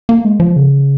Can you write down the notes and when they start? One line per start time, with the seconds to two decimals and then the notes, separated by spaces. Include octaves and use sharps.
0.09 A#3
0.25 G#3
0.40 F3
0.56 C#3